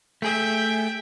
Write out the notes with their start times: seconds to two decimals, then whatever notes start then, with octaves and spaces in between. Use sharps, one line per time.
0.22 A3 G#4 E5 G5